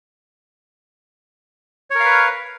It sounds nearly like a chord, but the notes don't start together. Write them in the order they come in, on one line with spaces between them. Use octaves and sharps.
C#5 A#4 F5 B4